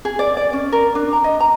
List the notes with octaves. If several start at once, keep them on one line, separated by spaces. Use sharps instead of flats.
G#4
D5
D5
C#4
A#4
D4
A#5
D#5
A#5